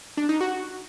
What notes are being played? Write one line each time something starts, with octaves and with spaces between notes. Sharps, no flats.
D4
D#4
F#4